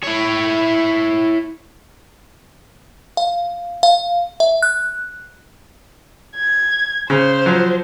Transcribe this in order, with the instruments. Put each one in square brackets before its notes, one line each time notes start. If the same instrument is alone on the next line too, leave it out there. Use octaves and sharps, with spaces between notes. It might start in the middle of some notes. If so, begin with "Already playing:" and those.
[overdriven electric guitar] E4 C#5
[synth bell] F5
F5
E5
F#6
[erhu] G#6
[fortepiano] C#3 [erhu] C5
[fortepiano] F3 F#3